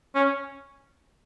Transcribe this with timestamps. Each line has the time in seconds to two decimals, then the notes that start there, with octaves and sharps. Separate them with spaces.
0.15 C#4